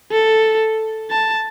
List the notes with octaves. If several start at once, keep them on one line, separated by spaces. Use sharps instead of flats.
A4
A5